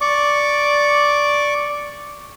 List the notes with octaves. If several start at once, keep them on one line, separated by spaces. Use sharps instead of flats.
D5 C#6 D6